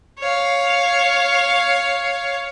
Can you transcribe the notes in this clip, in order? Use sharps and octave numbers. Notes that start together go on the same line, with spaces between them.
C#5 F5